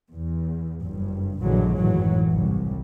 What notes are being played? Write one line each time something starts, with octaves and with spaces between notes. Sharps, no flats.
E2
F#1 G2
A#1 G2 D3 E3 F#3 G#3
G#1 F#2 A2 E3 F#3
C2